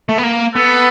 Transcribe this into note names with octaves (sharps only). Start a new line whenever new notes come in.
A3
B3
A#3
B3 A4 B4